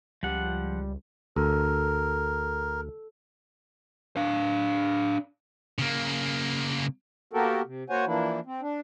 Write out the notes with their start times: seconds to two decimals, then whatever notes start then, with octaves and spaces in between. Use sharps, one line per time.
0.23 C#2 F3 G3 F#5
1.36 D2 A4 A#4
4.17 D4 F5
5.79 C#3 A#3
7.33 A#3 B3 F#4 G4 A4 A#4
7.65 C3
7.90 A#3 F#4 C5 C#5 F#5 G#5
8.06 E3 F3 A#3 D4 E4
8.46 C4
8.61 D4